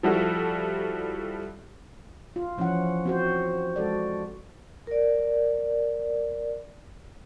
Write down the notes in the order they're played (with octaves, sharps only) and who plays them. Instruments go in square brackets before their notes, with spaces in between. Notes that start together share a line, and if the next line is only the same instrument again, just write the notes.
[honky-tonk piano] F3 G3 E4 F#4 A4
[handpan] F4
E3 F3 C#4 E4 F#5
C4 F#4 C5
G#3 F#4 A4 D5
[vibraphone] A#4 D5